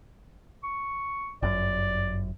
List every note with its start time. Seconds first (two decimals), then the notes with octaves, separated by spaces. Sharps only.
0.63 C#6
1.43 G1 F#2 D5